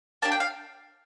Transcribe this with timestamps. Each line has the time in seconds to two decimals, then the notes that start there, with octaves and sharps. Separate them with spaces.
0.22 A#3 D4 G4 A5
0.32 G5
0.40 F5